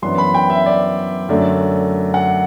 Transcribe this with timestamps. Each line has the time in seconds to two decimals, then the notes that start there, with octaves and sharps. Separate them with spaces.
0.02 F#2 E3 B3 D4 C6
0.18 B5
0.34 G5
0.50 E5
0.66 D5
1.29 F#2 D3 A3 D4
2.14 F#5